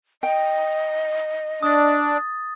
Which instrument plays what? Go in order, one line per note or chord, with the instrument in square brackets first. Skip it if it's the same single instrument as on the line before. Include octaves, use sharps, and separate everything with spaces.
[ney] D#5 [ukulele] G5
[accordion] D4 [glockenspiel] D#6 A6